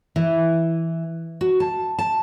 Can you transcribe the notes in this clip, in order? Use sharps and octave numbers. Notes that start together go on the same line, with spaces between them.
E3
F#4
A5
A5